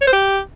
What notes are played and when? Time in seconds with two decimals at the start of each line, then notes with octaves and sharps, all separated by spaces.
0.01 C#5
0.07 C5
0.13 G4